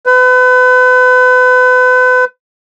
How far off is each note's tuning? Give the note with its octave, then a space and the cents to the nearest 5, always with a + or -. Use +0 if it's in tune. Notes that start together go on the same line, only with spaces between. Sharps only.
B4 +35